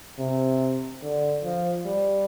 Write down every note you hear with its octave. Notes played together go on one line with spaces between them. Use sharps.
C3
D3
F3
G3